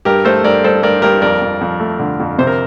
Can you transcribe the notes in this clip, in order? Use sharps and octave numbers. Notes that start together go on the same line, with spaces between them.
G2 G4 A#4
A3 A4 C5
G2 A#4 D5
G2 A4 C5
G2 A#4 D5
G2 G4 A#4
F2 A#4 D5
F2
F2
A3
D3
F2
C3 C5
A#4